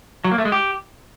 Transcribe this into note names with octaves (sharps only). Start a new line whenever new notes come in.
F#3
A#3
A3
G#3
G4